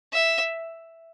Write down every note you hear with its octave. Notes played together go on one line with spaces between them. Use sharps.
E5